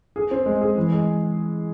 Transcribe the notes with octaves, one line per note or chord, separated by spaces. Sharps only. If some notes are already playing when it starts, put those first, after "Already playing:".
G#4
C4
G#3
G#4
E3
G#3